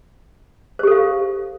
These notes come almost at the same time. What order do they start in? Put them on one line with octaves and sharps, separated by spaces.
C5 G4 A4 F5